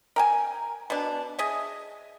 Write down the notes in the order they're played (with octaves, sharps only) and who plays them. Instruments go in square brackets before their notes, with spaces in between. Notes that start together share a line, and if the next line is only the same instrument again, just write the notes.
[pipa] A#4 G5 G#5
B2 D4
G#4 D#5 E5